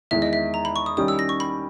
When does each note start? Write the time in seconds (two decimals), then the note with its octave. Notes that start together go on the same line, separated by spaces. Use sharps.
0.11 E2 D#3 G#3 E5
0.22 D#5
0.33 E5
0.54 A#5
0.65 B5
0.76 C#6
0.86 D#6
0.97 D#3 G3 C#4 G4 D#6
1.08 E6
1.19 A#6
1.29 C#6
1.40 B5